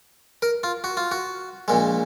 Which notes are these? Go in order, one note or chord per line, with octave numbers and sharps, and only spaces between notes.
A#4
F4
F#4
F4
F#4
A#1 A#2 G#3